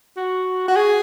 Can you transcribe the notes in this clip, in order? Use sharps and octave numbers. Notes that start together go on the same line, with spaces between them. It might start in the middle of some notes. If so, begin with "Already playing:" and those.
F#4
F#4
G#4